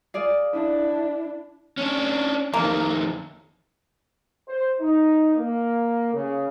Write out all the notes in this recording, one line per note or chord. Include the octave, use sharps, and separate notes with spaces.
G#4 D5 F5
D4 E4
C#4 D4
F2 D#3 A#3
C5
D#4
A#3
C#3